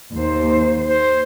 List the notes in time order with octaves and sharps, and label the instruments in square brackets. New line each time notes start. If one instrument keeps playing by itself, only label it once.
[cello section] D#2 C5
[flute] C5